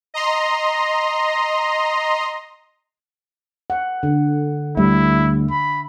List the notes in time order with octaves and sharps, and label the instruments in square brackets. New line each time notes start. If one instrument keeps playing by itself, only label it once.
[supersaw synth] D#5 A#5 C6
[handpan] F#5
D3
[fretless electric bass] D2 G3 [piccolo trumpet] E4 [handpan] E5
[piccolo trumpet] B5